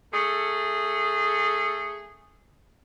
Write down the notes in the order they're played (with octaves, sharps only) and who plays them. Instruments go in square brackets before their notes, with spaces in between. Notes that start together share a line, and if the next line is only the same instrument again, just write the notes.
[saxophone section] A3 G#4 A4